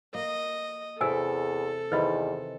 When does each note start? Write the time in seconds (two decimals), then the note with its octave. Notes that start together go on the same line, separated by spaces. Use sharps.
0.15 A#3 D#5
1.01 E2 C3 E3 A4 E5 G#5 E6
1.92 E2 C3 D#3 E3 B4 D#5 B5